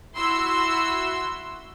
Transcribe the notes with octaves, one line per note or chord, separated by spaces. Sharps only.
E4 F#4 C6 E6